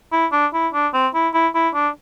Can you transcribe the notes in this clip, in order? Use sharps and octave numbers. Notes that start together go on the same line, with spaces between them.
E4
D4
E4
D4
C4
E4
E4
E4
D4